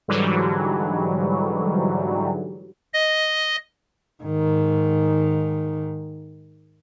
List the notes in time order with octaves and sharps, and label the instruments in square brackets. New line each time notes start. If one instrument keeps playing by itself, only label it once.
[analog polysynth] G#2 D3 E3 F#3 G3
[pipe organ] D#5
[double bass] G#2 D#3